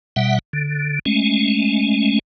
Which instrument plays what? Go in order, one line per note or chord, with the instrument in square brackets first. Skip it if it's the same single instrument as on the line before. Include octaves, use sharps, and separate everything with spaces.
[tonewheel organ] B2 G3 E5 F#5
D3
G#3 A3 C#4